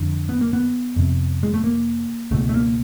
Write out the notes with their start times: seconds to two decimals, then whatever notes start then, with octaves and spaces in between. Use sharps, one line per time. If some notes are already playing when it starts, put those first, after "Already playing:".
Already playing: F2 D3
0.29 B3
0.41 A#3
0.53 B3
0.96 F2 C3
1.43 G#3
1.54 A3
1.64 A#3
2.31 C#2 B2 A3
2.49 A3
2.54 A#3